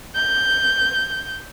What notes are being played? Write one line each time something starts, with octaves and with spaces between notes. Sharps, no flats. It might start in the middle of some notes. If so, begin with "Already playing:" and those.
G6